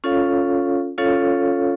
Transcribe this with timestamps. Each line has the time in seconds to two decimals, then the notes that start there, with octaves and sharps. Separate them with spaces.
0.04 C#4 F4 A4 C#5 F5
0.98 C#4 F4 A4 C#5 F5